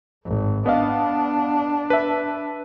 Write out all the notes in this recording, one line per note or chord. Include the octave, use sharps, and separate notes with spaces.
G#1
B3 D4 D#5 F5
B4 E5